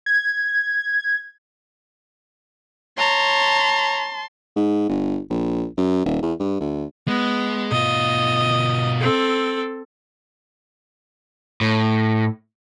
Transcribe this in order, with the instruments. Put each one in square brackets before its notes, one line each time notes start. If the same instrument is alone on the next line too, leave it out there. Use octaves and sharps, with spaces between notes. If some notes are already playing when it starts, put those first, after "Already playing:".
[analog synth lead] G#6
[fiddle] C#5 A#5 [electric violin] A5 C6
[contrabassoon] G#2
G1
A#1
F#2
D#1
E2
G2
D2
[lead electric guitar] G#3 [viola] B3
[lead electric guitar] B2 F4 [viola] D#5
[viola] C4 A4
[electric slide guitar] A2